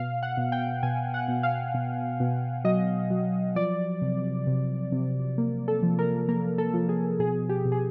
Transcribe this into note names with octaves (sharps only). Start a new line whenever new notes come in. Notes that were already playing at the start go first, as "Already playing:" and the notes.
Already playing: B2 F5
F#5
B2
G5
B2 G#5
F#5
B2
F5
B2
B2
F#3 D#5
F#3
F3 D5
C3
C3
C3
A#3
A4
F3
A#4
A#3 A#4
A4
F3
G#4
B2 G#4
G4
B2
G#4